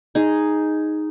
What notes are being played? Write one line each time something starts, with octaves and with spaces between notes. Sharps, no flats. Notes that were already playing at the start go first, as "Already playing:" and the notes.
D#4 G#4